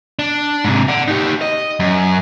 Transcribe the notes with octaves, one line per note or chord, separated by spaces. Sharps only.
D4
G#2 C3
D5 F#5
D#4 G4
D#5
F#2